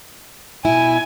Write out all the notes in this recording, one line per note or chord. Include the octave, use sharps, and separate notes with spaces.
B2 E4 G#5